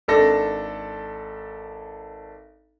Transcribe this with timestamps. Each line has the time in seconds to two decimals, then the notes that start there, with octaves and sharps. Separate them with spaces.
0.08 G#1 D4 A4 A#6